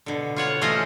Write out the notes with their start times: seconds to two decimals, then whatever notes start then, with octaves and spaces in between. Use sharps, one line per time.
0.06 B2 D3
0.36 F4 C#5 F#5
0.61 E3 A3 C#4 F4 C5 D#5